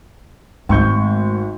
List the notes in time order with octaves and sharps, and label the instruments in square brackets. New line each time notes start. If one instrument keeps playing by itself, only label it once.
[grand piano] G#1 C#6 G6 [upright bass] G#3 A3